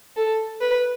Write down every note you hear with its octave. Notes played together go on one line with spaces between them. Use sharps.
A4
B4